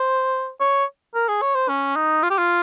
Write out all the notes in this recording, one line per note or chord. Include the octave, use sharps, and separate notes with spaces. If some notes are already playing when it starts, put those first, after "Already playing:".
Already playing: C5
C#5
A#4
G#4
C#5
C5
C#4
D#4
F4
G4
F4